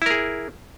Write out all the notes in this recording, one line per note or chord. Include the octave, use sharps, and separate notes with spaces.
E4 G#4 A#4